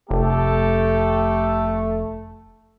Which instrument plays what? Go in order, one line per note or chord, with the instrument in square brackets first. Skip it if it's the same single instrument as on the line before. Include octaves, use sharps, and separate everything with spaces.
[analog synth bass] F1 [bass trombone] A3 [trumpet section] G4 A4